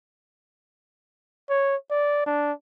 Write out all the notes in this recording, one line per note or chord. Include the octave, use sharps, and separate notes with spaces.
C#5
D5
D4